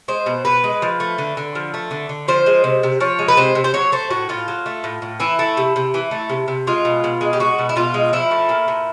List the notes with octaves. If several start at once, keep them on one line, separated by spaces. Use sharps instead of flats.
G#3 C5
B2
B2 B4
G#3
F3
A3
D3
D3
F3
A3
D3
D3
F3 C5
G#3
C3
C3
F3 C#5
G#3
B4
C3 C5
C3
C5
F#3 C#5
A3 C5
A2 F#4
A2 F4
F#3
A3
A2
A2
E3 E4
A3
C3
C3
E3
A3
C3
C3
G#3 F4
B2
B2
G#3
G4
G#3 F#4
B2
E4
B2 F4
G#3
F3 E4
A3
A#2
A#2